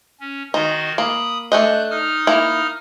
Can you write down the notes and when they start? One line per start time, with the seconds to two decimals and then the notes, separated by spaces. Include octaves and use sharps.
0.20 C#4
0.54 D#3 D#4 F#4 C6
0.98 A#3 B5 D#6
1.52 A3 D4 D#5 F#6 G6
1.91 D#4 D#6 F6
2.27 A#3 E4